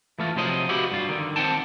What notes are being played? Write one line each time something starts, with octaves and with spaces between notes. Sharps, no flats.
E3 A3 F4
C3 F3 F#3 C5 D#5
E4 F#4 G4 B4 F5 F#5
G2 F4
D3 D#3
D#3 C4 F#5 G5 A5